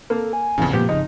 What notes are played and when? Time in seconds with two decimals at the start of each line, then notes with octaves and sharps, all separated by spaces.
0.10 A#3 A4
0.33 G#5
0.58 A1 F2 C#3 E3 B3
0.73 A#2 F3 G#3 A#3 B3 G4
0.89 G#1 C#3 D#4 D#5